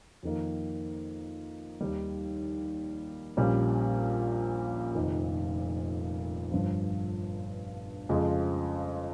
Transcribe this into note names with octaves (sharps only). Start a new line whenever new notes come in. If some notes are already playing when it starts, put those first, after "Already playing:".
F2 D#3 A#3
D#2 D#3 G3
A#1 A#2 G3 C#4
F1 F2 D#3
G1 G2 F3
F2 C#3 F3 G#3